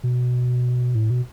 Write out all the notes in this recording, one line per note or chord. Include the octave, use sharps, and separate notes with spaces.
B2
A2
B2